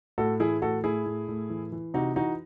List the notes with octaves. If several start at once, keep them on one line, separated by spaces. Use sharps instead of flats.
A2 F#4 A4
E3 E4 G#4
A2 F#4 A4
A2 E4 G#4
A2
A2
E3
E3
C3 D#4 F#4
E3 D#4 F#4